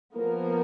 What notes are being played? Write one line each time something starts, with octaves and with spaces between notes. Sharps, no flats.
F3 A#3 B3 A#4